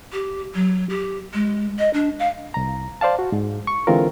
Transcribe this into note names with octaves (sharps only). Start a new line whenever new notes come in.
G4
F#3
G4
G#3
D#5
D4
F5
C2 A#5
C5 D5 F5 A5
F#4
G#2
C#6
D3 E3 G#3 C4 F4 A#4